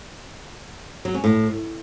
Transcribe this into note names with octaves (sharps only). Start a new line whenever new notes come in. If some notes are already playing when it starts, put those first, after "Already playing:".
F#3
C#4
A2